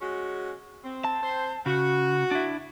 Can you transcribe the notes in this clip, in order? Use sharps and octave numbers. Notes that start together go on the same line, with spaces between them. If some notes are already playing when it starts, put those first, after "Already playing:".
G#3 C#4 F#4
C4
A5
C4 C5
C#3 F#4
D4 E4